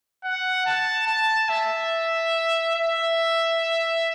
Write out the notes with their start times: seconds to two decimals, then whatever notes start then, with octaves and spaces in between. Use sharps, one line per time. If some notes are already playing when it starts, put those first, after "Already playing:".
0.24 F#5
0.66 A5
1.07 A5
1.49 E5
2.75 E5